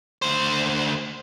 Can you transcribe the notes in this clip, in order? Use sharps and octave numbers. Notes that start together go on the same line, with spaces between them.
D2 C5